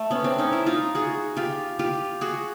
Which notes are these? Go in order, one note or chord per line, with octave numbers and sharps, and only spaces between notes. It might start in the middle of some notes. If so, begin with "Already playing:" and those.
Already playing: A3
B3 C#4
C4 D4
C#4 D#4
D4 E4
D#4 F4
F#4 G#4
F4 G4
F4 G4
F#4 G#4